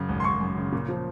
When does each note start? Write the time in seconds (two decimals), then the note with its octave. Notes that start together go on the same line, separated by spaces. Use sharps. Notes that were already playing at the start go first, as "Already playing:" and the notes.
Already playing: F#2 C#3
0.09 G#1
0.20 C6
0.24 G#1 C#6
0.41 F#2
0.57 C#3
0.72 A#2
0.88 F3